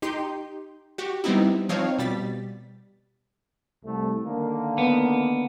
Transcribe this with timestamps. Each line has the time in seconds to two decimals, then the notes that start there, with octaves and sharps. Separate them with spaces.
0.02 D#4 G4 C6 G6
0.98 F#4 G4
1.24 G3 B3 C4 D#4 E4
1.69 F3 C4 D#4 C#5 F5
1.98 B2 G3 A6 B6
3.84 C2 A3
4.25 D3 D#3 A#3
4.78 B3